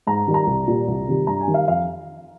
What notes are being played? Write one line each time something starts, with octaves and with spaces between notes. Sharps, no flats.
G#2 A#5
D#3 G3
A#5
C2
A#2 G3
C2
C3 D#3 G3
G2 A#5
G#5
D#3 G3
F5
F2 F5